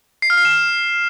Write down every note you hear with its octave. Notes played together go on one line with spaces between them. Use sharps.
C7
F6
C7
E7